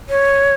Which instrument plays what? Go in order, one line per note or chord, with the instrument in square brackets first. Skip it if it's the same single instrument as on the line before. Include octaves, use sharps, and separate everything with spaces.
[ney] C#5